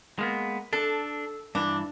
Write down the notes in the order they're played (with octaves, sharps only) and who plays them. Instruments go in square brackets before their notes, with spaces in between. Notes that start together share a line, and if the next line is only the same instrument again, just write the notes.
[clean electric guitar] G#3 A#3 B3
[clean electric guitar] D4 [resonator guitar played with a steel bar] A4
[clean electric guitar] G2 E3 [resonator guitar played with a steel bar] D4